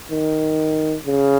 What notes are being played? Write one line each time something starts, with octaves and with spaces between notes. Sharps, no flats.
D#3
C#3